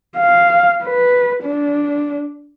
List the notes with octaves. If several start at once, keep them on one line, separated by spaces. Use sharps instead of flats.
F5
B4
D4